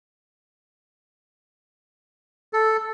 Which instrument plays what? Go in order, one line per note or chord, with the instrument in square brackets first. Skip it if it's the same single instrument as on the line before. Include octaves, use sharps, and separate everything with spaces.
[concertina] A4